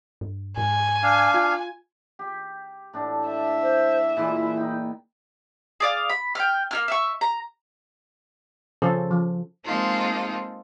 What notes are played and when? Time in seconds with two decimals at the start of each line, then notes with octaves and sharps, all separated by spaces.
0.21 G2
0.57 G#2 G#5
1.03 D4 F5
1.34 F4
2.19 G4
2.93 A2 D4
3.28 E5
3.62 C5
4.17 A#2 E3 G#3 E4
4.57 D#4 G5
5.80 G#4 D5 F5
6.10 B5
6.35 G5 F6
6.71 A#3 E4 F6
6.88 E5 C#6
7.21 A#5
8.82 C#3 F3 C#4 A4 C5
9.11 F3
9.64 G#3 A#3 C4 D#4 F4 A4